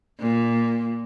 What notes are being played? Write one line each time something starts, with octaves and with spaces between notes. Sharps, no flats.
A#2